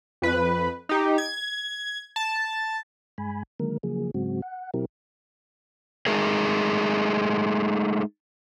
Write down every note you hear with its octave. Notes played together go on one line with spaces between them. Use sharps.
F2 B4
D#4 G4
G#6
A5
G2 G#3 G#5 B5
D3 D#3 F#3 G#3 A#3 A#4
C#3 F3 F#3 A#3 G#4
G#2 C#3 F#3 G#3 C4 F#4
F#5
B2 F#3 C4 E4 G4 A#4
G#3 A3 D#4 G#4 A#4